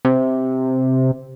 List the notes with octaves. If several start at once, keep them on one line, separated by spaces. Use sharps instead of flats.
C3